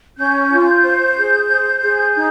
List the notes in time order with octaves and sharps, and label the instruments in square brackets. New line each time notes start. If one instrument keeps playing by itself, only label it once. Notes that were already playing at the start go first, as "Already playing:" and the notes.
[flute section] C#4 G6
F4
C5
G#4
C5
G#4
D#4